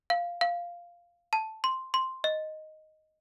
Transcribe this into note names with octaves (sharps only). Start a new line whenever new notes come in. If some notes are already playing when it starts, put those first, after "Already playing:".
F5
F5
A5
C6
C6
D#5